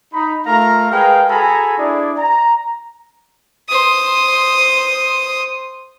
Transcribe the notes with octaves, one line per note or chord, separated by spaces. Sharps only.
D#4 B5
A3 F4 A#4 F5 A#5
G#3 G#4 A#4 B4 F5 G5
F#4 G#4 A4 G#5 A#5 B5
D4 E4 G#4 D5
A#5
C5 D#6